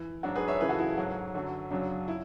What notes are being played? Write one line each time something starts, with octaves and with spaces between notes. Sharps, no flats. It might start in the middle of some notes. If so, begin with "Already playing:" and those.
Already playing: E3
G#2 F#3 D4 F#4
G#4 B4
C#5 E5
F#2 C#3 E3 G#4 B4
F#4 A4
E4
G#2 F#3
F#2 D3 F#3
F#2 C#3 F#3 D4
E4